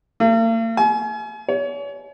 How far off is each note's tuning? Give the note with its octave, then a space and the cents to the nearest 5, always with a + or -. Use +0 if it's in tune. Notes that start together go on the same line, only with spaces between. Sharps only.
A#3 -45
G#5 +35
C#5 +35